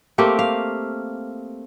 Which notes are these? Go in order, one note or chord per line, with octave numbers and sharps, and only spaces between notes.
A3 A#3 C4 G4
F5